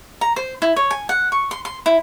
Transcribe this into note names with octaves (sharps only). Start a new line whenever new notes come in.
A#5
C5
E4
C#5
G#5
F#5
C#6
C6
C6
E4